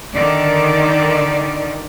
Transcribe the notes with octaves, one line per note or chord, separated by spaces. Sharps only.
D3 D#3 D5